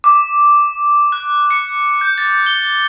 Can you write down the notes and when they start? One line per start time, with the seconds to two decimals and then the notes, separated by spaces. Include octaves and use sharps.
0.04 D6
1.12 F#6
1.51 C#7
2.01 G6
2.18 A6
2.46 G7